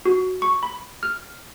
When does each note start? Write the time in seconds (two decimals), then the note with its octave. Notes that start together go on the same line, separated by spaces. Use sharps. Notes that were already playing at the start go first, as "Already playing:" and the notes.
0.06 F#4
0.42 C#6
0.63 B5
1.03 F6